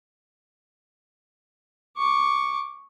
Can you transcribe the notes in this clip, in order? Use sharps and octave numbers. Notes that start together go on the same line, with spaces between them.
C#6 D6